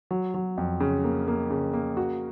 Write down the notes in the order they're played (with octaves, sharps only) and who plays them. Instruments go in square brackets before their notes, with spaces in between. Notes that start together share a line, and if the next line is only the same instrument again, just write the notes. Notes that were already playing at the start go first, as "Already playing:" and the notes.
[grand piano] F#3
F#3
F2
C#3
A#3
A#3
C#3
A#3
F#4